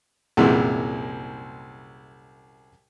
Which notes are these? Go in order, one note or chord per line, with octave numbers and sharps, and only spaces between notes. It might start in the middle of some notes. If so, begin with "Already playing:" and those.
C2 F#2 A#2 E3 G#3